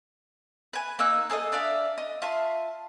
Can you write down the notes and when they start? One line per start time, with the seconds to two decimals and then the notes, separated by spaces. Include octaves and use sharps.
0.73 B4 G#5
0.99 A#3 D#4 E6 F#6
1.30 G#4 A4 C5 D#5
1.52 D4 D5 E5 F5
1.98 D#5
2.22 F4 E5 A5 C6